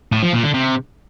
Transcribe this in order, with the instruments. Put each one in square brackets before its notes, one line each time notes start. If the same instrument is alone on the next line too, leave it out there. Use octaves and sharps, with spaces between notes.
[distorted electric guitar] A2
F3
A#2
D3
C3